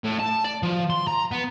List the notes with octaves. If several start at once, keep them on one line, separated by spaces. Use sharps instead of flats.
A2
A5
D5
F3
C6
A#5
B3